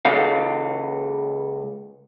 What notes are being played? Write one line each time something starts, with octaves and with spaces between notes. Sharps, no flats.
C#2 C#3 A4 D#5 F5